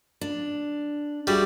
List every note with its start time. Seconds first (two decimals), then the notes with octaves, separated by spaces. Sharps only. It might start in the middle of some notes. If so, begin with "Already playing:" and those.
0.21 D4
1.27 G3 F#4 G#4 E5